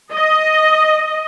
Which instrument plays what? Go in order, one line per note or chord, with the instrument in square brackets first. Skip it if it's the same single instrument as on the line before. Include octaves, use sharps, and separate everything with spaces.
[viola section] D#5